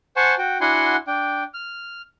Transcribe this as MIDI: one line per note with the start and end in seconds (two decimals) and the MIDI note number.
0.16 0.35 72
0.16 0.35 78
0.16 0.35 80
0.16 0.35 81
0.16 0.35 85
0.38 0.58 66
0.38 0.58 79
0.61 0.96 62
0.61 0.96 64
0.61 0.96 66
0.61 0.96 78
0.61 0.96 80
0.61 0.96 84
1.07 1.43 62
1.07 1.43 79
1.54 2.02 89